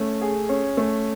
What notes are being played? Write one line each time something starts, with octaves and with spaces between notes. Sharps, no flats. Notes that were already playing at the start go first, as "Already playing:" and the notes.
Already playing: A3 C#4
G#4
C#4
A3